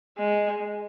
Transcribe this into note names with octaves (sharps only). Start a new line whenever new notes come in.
G#3